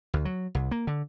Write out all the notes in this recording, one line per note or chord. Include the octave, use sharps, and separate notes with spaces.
D2
F#3
C2
A#3
D3